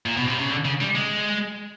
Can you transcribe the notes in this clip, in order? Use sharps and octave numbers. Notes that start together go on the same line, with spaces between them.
A#2
B2
C3
C#3
D3
C#3
G3
G#3